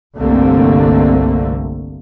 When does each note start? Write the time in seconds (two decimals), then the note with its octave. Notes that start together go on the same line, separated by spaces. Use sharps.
0.17 G1 C2 D3 A3 A#3 C4